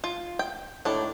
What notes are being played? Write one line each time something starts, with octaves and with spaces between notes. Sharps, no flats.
F4
G5
A2 D#3 D4